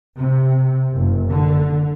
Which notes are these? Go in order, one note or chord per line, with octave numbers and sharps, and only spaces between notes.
C3
F#1
D3